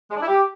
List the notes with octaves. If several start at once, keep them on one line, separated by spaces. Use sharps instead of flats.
G#3
D4
E4
G4